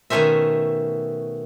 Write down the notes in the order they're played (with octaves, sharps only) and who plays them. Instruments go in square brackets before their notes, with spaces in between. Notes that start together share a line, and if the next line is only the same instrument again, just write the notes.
[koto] B2 D#3 A3 C#4 C5 E5